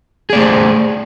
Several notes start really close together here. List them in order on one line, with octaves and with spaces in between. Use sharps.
G#4 D5 A3 C5